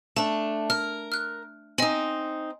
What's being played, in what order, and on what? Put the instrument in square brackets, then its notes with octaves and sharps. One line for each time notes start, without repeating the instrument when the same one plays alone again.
[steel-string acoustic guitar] A3 D4 [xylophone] A5
[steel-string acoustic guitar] A#4 [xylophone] F6
[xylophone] F6 F#6
[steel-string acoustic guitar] C4 D#4 [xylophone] D#5 G#5